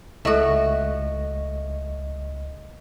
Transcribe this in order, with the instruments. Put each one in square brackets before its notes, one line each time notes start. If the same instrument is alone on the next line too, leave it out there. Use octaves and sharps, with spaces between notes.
[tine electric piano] C#2 D#5 C#6 [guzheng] A3 F#4 [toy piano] E4 A4